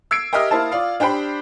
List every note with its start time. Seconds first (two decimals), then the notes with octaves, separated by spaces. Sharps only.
0.11 E6 G#6 C7 D7
0.33 G4 A#4 D#5 E5 D#6 F6
0.51 A#3 E4 C5 A5
0.71 F4 D5 F5
1.00 D4 G4 C5 G5 B5